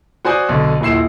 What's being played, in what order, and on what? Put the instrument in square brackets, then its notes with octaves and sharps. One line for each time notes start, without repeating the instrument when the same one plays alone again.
[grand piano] F#4 C5 D5 G#5 D#6
B1 D3
D#1 A#1 E4 C7 E7